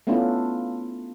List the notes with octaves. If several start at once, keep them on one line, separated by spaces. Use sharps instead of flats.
A3 B3 C#4 D4 E4 F4